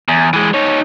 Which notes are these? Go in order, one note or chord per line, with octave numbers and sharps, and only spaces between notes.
E2
E3 G#3
D#4 C#5